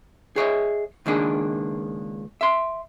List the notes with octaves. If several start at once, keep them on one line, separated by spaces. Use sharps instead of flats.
G#4 C#5 D#5 E5
C#2 D#3 A#3 D4 G#4
E5 C6